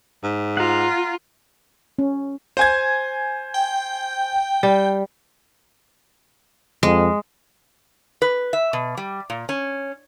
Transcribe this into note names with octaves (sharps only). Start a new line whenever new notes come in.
G#2
F4 F#5 A#5
C#4
C5 G#5 G#6
G5
G3
F2 G#3
B4
E5
B2
G3
A#2
C#4